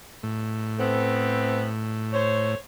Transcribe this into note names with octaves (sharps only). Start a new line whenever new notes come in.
A2
A3 B3 C4
C5 C#5